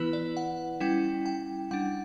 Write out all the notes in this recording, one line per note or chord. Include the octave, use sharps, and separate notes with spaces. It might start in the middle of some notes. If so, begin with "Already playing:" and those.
Already playing: E3 B3 E4 B4
D5
F#5
G3 C#4 E4 G5
G5
G3 D4 F#5